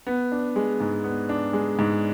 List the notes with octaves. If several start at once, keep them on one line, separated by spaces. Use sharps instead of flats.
B3
D4
G#3
G#2
B3
D4
G#3
G#2